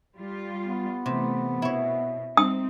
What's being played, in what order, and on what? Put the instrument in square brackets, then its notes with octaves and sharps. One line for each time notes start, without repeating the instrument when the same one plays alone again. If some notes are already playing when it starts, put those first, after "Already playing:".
[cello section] G3 F4
[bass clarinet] B3
[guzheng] C3 [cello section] E3 A3
[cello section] B2 [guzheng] E4 C#5
[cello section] C4 D#4 [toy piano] D#6